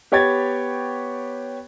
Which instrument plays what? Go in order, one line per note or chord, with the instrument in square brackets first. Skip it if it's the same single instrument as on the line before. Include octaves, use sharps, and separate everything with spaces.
[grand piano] B3 G4 C#5 G5 G#6 A6